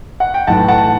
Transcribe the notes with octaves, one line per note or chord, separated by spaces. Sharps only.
F#5
G5
B1 A2 E3 F#5 A5
F#5 A5